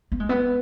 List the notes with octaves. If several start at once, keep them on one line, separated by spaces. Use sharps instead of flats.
B3
G#3
B3